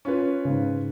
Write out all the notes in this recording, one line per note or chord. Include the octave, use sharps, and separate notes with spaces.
C#4 F4 B4
G#2 C#3